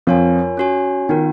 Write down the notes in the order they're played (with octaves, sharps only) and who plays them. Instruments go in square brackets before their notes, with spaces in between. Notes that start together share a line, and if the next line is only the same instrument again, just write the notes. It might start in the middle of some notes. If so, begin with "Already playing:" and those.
[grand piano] F2 F3 [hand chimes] F4 A#4 C#5 G#5
[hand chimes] C#4 F#4 C#5 G#5
[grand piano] D#3 [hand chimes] B3 F4 A#4